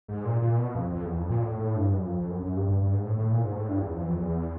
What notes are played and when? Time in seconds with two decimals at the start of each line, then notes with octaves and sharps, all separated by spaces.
0.08 G#2
0.25 A#2
0.42 A#2
0.58 B2
0.75 F2
0.92 F2
1.04 E2
1.17 F2
1.29 A#2
1.42 A2
1.59 A2
1.76 G2
1.92 F#2
2.06 F2
2.18 F2
2.30 F#2
2.43 F#2
2.56 G2
2.68 G2
2.81 G2
2.94 G#2
3.05 A2
3.18 A2
3.31 A#2
3.44 G#2
3.56 A2
3.69 G2
3.81 E2
3.94 F2
4.02 E2
4.10 F2
4.19 E2